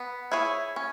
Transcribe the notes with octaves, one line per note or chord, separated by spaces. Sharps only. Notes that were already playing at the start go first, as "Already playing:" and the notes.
Already playing: B3
E4 G#4 C#5
C#4